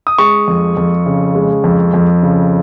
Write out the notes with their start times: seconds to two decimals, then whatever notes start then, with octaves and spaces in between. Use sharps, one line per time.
0.07 D#6
0.18 G#3 C#6
0.48 F2
0.77 F2
1.06 C#3
1.35 G#3
1.64 F2
1.94 F2
2.22 C#3